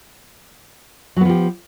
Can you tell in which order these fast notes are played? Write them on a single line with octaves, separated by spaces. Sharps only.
F#3 B3 F3 G4